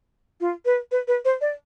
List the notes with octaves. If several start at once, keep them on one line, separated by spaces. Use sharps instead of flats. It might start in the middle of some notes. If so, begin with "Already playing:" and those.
F4
B4
B4
B4
C5
D5